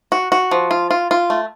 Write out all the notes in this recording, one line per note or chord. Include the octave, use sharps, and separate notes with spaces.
F#4
F#4
F3
F4
F4
F4
A3